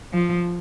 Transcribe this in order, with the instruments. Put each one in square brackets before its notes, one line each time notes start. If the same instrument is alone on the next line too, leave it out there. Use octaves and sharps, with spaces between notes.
[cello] F3